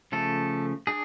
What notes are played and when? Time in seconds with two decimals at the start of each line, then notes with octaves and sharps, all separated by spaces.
0.12 C#3 F3 A3 A4
0.87 D4 G#4